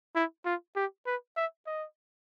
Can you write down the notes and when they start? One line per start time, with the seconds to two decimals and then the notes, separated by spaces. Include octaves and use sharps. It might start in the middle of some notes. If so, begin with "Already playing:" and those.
0.15 E4
0.45 F4
0.76 G4
1.06 B4
1.37 E5
1.66 D#5